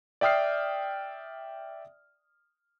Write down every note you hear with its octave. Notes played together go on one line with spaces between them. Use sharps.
D5 E5 G5 D#6 F6 C7